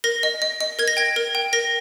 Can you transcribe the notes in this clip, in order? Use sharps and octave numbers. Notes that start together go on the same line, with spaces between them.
A#4 A#6
D#5
D#5
D#5
A#4 G#6
A#6
G5 G#6
A#4
G5
A#4 A#6